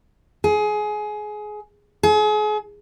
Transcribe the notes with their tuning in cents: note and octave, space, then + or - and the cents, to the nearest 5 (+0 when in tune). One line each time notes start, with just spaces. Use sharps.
G#4 +20
G#4 +35